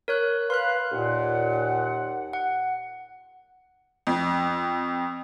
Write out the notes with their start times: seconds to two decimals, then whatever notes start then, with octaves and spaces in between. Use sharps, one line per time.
0.08 A#4 C#5 F#6
0.50 B4 F5 C6 F#6
0.92 D#2 A#2 F#5
2.33 F#5
4.07 F2